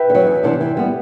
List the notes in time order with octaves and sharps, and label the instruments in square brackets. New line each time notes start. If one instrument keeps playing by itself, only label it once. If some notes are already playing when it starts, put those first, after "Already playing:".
Already playing: [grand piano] B4 E5 G5
[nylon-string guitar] D3
F#3
E2
C3 E3 B3 D4
E3
G3 B3